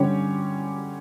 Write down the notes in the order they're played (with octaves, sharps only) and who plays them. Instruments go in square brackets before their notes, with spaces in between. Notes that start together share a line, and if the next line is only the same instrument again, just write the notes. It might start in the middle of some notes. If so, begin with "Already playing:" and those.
Already playing: [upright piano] D3 G3 C#4 G4 C#5